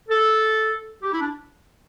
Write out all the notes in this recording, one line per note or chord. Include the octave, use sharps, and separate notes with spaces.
A4
G4
E4
D4